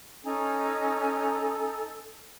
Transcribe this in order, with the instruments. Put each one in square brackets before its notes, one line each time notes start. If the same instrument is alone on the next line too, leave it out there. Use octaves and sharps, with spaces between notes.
[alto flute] C#4 [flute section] D#4 G#5 A#5 [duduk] A4